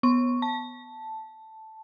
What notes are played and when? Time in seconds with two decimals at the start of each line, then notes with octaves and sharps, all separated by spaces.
0.03 B3 C#6
0.42 A5